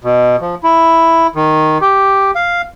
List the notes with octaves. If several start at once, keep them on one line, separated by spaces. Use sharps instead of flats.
B2
F3
E4
D#3
G4
F5